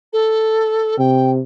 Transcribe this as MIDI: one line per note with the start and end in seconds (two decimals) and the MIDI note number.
0.13 0.98 69
0.98 1.42 48
0.98 1.30 79